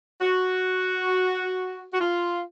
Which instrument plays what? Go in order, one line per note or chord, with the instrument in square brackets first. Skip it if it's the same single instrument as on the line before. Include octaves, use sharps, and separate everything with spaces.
[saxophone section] F#4
F#4
F4